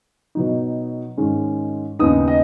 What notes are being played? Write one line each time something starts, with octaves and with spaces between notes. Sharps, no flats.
B2 F#3 D#4
G#2 D#3 G#3 C#4
D#2 C#3 B3 D#4 D#6
D#5